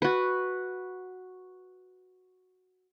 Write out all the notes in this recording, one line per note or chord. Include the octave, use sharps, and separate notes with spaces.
F#4 B4